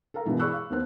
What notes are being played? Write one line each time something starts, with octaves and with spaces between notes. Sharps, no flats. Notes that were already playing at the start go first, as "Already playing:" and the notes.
A4 A#4 F5 A#5
G2 B2 E3 G#3
G#4 D5 B5 C#6 E6 F#6
F5
D#2 A#3 B3 C5 F#6